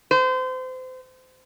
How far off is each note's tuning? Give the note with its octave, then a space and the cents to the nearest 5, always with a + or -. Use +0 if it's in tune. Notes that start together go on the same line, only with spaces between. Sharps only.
C5 -30